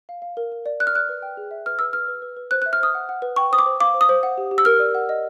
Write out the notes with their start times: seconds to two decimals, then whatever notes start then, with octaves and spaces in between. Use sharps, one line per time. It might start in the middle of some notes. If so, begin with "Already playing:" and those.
0.09 F5
0.22 F5
0.37 A#4
0.52 A#4
0.66 D5
0.80 D5 F#6
0.87 F6
0.94 D5 F#6
1.09 B4
1.23 G5
1.37 G#4
1.51 E5
1.66 B4 F6
1.79 B4 E6
1.93 B4 F6
2.08 B4
2.22 B4
2.37 B4
2.51 C5 F#6
2.62 E5 F#6
2.73 F6
2.80 C5 D#6
2.95 F#5
3.09 F#5
3.22 B4
3.36 G5 C#6
3.51 C5 D#6
3.58 D6
3.66 C5
3.80 F5 D6
3.94 C5
4.01 D#6
4.09 C5
4.23 F#5
4.38 G4
4.51 G4
4.58 E6
4.65 A#4 F6
4.79 D5
4.95 F#5
5.09 D#5